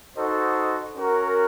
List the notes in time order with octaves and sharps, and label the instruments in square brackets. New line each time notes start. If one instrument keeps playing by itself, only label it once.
[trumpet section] D#4 F#4 A4 C5 D#5
C#4 F#4 A#4